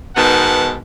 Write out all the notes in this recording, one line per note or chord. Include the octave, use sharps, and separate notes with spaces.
G#2 B2 D#3 B3 F#5 A5